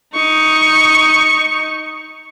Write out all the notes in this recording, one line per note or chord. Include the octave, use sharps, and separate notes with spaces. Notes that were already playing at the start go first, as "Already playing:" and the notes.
D#4 C#6